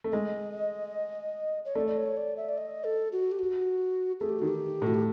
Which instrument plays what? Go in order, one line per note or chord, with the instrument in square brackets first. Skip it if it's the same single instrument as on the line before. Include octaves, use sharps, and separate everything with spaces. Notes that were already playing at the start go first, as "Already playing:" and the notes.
[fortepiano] A3
[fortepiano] G#3 [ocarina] D#5
[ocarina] C#5
[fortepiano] A3 [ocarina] D5
[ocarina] D5
C#5
D5
E5
D5
D#5
A4
F#4
G4
F#4
[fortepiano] A3 [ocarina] G#4
[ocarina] G4
[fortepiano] D#3 [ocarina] F#4
[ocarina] G4
[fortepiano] A2 [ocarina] F#4
[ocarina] G4